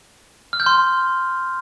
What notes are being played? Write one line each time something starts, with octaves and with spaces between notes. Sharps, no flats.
F6
G6
C6